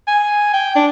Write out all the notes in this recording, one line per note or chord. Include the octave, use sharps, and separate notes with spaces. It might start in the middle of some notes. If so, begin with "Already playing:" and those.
G#5
G5
D4